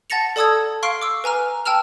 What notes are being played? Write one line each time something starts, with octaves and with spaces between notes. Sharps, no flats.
F#5 A5 A6 A#6 C#7 F7
A4 D5 A5 D#6 E6 G#6
F5 C6 C#6 F6 C7 D7
D6 E6
B4 G#5 A#5 F6
G5 A5 E6 F6 F7